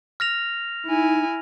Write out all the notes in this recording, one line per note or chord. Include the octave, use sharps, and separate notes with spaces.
F6 A#6 F7
D#4 E4 G#5